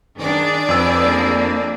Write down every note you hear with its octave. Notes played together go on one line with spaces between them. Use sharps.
D#3 D4 G#4 D5
F2 B4 E6
A#3 D4